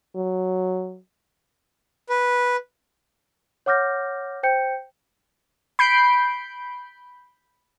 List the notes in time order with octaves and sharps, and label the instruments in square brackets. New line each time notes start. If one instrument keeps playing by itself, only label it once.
[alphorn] F#3
[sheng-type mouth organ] B4
[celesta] C#5 F#5 D6 F6 G6 A#6
C5 G5 G6 C#7
[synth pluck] B5 G6 C7 D7